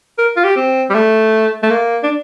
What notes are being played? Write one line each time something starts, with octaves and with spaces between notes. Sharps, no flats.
A#4
F4
G4
C4
G3
A3
A3
A#3
D4